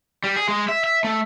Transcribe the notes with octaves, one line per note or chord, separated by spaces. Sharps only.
G3
G#4
G#3
E5
E5
A3